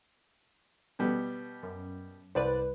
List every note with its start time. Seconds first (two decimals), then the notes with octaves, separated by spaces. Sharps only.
0.99 B2 G3 B3
1.63 F#2
2.35 C2 B4 C5 D5